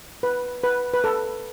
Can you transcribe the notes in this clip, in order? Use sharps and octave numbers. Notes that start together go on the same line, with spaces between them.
B4
B4
B4
A4